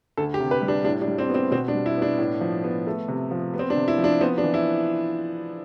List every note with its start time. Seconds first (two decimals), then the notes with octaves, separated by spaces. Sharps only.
0.17 D2 A4
0.34 G4
0.40 C3
0.51 B4
0.62 G3
0.68 D4
0.85 A2 D4
1.02 D4
1.08 G3
1.18 C4
1.29 B3
1.34 C4
1.51 B2 C4
1.68 D4
1.74 G3
1.86 E4
1.97 B3
2.02 D4
2.19 A2
2.41 F3
2.64 B3
2.87 A3
3.08 C3
3.31 F3
3.54 B3
3.59 C4
3.70 D4
3.76 C3
3.88 E4
3.98 F3
4.04 D4
4.21 B3 C4
4.38 D4
4.43 E3
4.54 E4